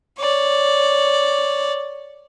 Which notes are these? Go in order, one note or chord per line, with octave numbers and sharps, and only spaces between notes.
C#5 D5